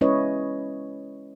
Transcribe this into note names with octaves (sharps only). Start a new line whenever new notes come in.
G#3 C#4 E4 B4 C#5 D#5